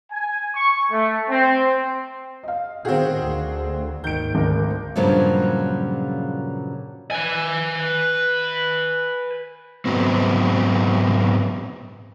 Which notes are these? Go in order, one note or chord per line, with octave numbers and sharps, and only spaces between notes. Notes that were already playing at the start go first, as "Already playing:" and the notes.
G#5
C#6
A3
C4
D#5 F5
A2 D#3 C4 F#4 G#4
D2
G#1 D#2 G#2 D#3 G6 D7
G#1 D2 A#4
G2 A#2 C#3 F3 F#3
B4 G#5
G#2 F#3 B3 C4